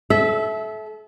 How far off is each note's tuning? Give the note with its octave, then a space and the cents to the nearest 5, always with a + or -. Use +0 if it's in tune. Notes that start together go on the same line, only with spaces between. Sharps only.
A4 -35 E5 -10